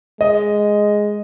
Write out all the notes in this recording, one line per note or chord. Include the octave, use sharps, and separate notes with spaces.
G#3 D#5